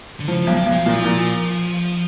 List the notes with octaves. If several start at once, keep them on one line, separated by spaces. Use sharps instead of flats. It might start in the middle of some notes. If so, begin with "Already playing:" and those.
D3
C#3 F3
B1 G3
G3
B1
F3
A#2 F3
A#2